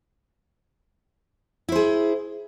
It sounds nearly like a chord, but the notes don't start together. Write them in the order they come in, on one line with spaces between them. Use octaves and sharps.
E4 C5 G#4